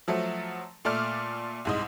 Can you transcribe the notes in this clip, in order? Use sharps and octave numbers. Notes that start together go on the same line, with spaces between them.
F3 F#3 A3
A#2 A3 D5 D6 F6
C2 G#2 D#5